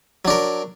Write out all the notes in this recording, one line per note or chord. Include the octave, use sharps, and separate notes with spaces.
F#3 D4 A#4